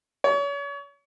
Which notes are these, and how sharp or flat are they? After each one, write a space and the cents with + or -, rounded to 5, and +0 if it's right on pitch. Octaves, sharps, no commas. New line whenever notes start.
C#5 +35